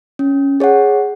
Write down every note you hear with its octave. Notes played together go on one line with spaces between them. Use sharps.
C#4
G#4 C#5 F#5